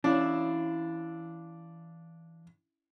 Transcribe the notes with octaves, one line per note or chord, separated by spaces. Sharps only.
E3 C#4 D4 E4 F5